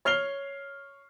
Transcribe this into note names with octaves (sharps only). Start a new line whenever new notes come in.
C#5 F6 C7 F7 G7